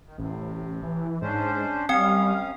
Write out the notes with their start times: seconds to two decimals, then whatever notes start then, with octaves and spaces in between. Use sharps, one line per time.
0.06 D#3
0.18 A1 A2 C3
0.83 E3
1.22 G#2 C#4 D4 C5
1.89 F#2 G3 C4 C#4 F5 G5